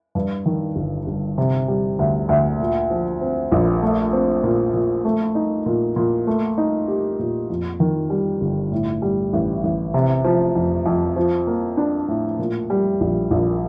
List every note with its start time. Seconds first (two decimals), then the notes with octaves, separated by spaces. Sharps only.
0.15 G2
0.46 D#3
0.76 G1
1.07 G1
1.38 C3
1.68 G3
1.99 D2
2.29 D2
2.60 A#2
2.90 F3
3.21 C4
3.52 A#1
3.83 A3
4.13 C4
4.43 A#2
4.74 A#2
5.05 A3
5.35 D#4
5.66 A#2
5.96 A#2
6.27 A3
6.58 D#4
6.88 G4
7.19 A#2
7.49 F2
7.80 D#3
8.10 G3
8.41 G1
8.72 A2
9.02 G3
9.33 A1
9.63 A1
9.94 C3
10.24 F3
10.55 F2
10.86 F2
11.16 F3
11.47 A#3
11.77 D4
12.08 A2
12.39 A#2
12.70 G3
13.00 A#1
13.31 A#1